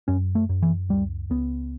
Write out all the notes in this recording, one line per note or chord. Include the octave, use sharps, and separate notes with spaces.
F#2 C#4
A3
F#2
E3
C#2 G3
C#2 B3